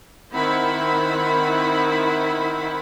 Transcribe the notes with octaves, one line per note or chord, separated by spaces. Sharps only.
D#3 C4 E4 F#5 B5